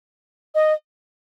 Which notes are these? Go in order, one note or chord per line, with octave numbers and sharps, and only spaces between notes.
D#5